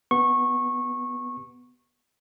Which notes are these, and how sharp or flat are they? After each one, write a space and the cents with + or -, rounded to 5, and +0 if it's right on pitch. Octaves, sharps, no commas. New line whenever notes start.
B3 +0 G4 +0 C#6 -20